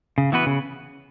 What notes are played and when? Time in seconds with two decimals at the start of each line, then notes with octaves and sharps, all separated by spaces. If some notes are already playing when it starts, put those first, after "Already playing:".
0.18 C#3
0.32 E3 B3 F#4 B4
0.46 C#3